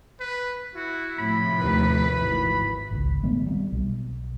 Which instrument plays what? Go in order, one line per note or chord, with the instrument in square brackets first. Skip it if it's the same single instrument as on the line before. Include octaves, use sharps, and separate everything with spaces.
[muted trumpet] B4
[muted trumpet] E4 [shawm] F#4
[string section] A2 C3 F3 [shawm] B5
[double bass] D#2 [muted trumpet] B4
[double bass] G#1 E3
[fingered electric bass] G#1 C#2
D#3 G#3 A3 B3
G3 A3 C4
B1